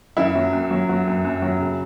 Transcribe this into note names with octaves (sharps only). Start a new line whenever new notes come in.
F#2 E4
F#3
F#2
F#3
F#3
F#2
F#2
F#3
C#3